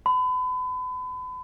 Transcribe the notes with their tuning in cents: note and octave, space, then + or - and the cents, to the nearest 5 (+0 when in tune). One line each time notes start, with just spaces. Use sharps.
B5 +35